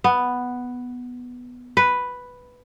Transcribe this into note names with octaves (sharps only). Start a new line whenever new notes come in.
B3
B4